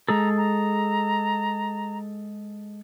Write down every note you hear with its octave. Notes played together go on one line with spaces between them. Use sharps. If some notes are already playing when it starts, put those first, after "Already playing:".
G#3 G#4 A4 A#5
A#5